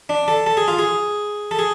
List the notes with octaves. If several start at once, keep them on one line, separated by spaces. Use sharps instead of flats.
D4
A4
A4
G#4
F4
G#4
A4
G#4